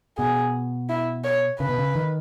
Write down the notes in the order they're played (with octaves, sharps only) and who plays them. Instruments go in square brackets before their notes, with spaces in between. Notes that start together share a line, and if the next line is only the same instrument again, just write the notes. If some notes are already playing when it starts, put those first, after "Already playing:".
[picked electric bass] B2 [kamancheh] G#4
[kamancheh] E4
C#5
[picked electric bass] C#3 [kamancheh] B4
[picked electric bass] B2
C#3
D#3